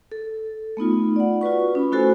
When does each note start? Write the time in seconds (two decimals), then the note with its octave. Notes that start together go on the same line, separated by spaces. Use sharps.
0.12 A4
0.77 A3 B3 D#4 F4
1.16 D5 F#5
1.41 F4 F#4 B4 C#6
1.75 C#4 E4 B5
1.92 A3 E4 F#4 A4 C5 G#5